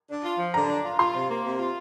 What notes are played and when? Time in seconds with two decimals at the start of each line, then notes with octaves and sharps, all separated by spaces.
0.09 D4
0.23 F4
0.39 F3
0.54 D3 A#5
0.69 D4
0.84 F4
0.99 F4 C6
1.14 C3
1.29 A#3
1.44 C3
1.59 F4